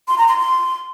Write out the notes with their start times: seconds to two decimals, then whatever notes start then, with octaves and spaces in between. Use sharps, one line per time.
0.08 C6
0.18 A#5
0.28 C6
0.38 C6